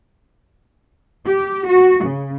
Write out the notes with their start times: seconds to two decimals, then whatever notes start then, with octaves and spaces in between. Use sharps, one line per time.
1.25 G4
1.67 F#4
2.04 C#3